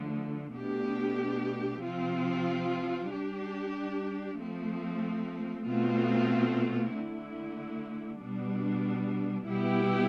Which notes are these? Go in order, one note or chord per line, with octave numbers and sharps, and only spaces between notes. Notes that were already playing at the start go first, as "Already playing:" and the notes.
Already playing: D3 F3 A3
B2 A3 D4 G4
C3 F3 C4 F4
G3 D4 G4
F3 A3 C4
B2 A3 C4 F4
D3 A3 E4
B2 G3 D4
B2 G3 B3 E4 G4